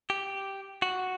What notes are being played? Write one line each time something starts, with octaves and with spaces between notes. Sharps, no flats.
G4
F#4